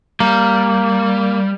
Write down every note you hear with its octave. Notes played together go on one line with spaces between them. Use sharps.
G3 A#3